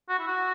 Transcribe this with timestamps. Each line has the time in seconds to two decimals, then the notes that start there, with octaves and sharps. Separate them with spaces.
0.09 F#4
0.19 E4
0.27 F#4